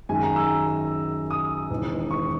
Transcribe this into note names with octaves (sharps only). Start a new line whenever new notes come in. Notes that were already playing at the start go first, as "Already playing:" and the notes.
F#2 D#3 G#3 G#5
A#5
E6
D#6
E1 E2 D#3
C#6